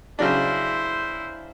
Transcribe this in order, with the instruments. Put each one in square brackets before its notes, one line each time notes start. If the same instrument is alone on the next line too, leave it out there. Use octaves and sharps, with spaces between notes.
[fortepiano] C#3 F#3 D4 [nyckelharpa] E4 C5